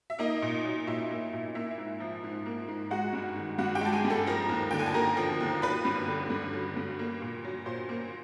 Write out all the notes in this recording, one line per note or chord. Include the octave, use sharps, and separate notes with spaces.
E5
A#3 D#4 D#5
A#2
F#3
A#2 E4 E5
A#3
A#2
A#3 E4 E5
G#2
F3
G#2
A#3
G#2
G#3 F#4 F#5
G2
D#3
G2 F#4 F#5
G4 G5
G#3 A5
G#4 G#5
G2
A4 A5
F3 A#4 A#5
D#2
D3 G5
G#5
A5
A#3 A#4 A#5
F3
D#2
F#3 B4 B5
G2
D3
G2
F#3
G2
A#3
A#2
F#3
A#2 C5 C6
A#3